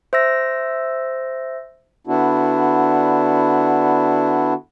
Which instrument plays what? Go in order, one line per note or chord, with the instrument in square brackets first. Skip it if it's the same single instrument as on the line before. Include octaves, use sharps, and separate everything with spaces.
[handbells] C5 E5 E6 A#6
[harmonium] D3 B3 D4 E4 F#4